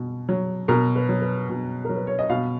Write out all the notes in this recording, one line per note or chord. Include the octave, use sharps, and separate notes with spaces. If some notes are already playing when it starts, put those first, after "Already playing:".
Already playing: B2
F#3
B2 A#4
B4
F#3
B4
B2
F#3 A#4
B4
C#5
D#5
B2 F5